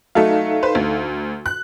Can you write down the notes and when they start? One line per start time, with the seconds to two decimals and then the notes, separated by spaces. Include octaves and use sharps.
0.15 F#3 A3 D#4 A4 F5
0.63 B4 C5
0.75 D2
1.46 F#6